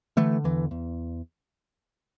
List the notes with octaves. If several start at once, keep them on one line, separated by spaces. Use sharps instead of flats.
D3 E3 A3
E2 E3
E2